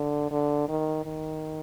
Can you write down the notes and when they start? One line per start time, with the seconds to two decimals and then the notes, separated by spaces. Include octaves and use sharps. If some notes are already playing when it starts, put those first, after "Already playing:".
Already playing: D3
0.31 D3
0.68 D#3
1.05 D#3